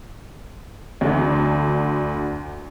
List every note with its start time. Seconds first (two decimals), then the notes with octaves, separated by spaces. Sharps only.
1.01 D2 D3